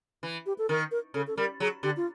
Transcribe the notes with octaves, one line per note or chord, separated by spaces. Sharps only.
E3
G4
A4
D#3 A#4
A#4
C#3 A4
A4
G3 A#4
F#3 G#4
D3 G4
F4